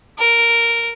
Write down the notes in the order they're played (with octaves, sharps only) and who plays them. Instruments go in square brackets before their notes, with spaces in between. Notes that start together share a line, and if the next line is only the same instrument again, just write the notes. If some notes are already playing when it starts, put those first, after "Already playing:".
[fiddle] A#4